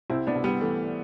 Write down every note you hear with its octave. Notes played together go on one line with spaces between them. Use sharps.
C2 C4 E4
B3 D4
C2
G3 B3
E3 A3